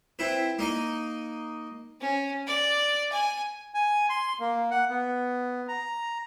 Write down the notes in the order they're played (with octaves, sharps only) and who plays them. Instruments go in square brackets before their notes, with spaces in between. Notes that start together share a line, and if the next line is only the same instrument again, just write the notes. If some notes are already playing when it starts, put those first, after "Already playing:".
[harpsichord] C4 E4 B4
A#3 D#4 D#5
[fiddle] C#4
D5
G#5
[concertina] G#5
C6
A#3
F#5
B3
A#5